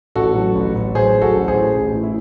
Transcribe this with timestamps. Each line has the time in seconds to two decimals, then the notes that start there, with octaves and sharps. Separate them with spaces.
0.15 A1 F#4 A4
0.35 F#3
0.55 A1
0.75 A1
0.95 F#3 G#4 C5
1.15 F#3
1.22 F#4 A4
1.35 A1
1.48 G#4 C5
1.55 A2
1.74 A1
1.94 A2
2.03 E4